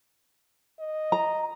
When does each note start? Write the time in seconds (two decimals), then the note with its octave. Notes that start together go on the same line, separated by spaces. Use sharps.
0.80 D#5
1.12 A#5